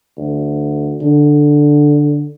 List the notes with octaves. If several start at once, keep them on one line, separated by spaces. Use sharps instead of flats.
D2
D3